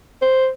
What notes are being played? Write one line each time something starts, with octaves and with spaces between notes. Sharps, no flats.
C5